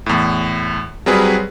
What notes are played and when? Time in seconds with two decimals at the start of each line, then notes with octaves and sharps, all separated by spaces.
0.06 E2 A2
1.06 F#3 G3 C4 G#4 B4